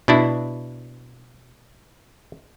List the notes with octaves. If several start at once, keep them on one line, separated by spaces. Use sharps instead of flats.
B2 D4 E4